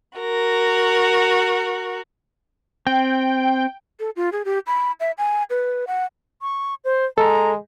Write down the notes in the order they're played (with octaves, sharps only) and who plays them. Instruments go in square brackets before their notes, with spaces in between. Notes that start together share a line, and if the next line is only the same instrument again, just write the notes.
[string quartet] F#4 A#4
[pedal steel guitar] C4 [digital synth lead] G5
[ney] A4
F4
G#4
G4
B5
E5
G#5
B4
F#5
[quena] C#6
C5
[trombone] G#3 [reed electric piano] A4 [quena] A#5